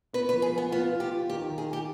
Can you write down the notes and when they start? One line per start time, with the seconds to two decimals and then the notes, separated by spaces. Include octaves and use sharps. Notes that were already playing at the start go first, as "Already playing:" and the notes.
0.13 B3 B4
0.29 B4
0.33 F3
0.42 G#4
0.52 F3
0.58 B3
0.72 B3 F4
0.91 F4
1.00 G4
1.11 F4
1.30 D#3 G4
1.49 D#3
1.58 G#4
1.68 D#3
1.73 G4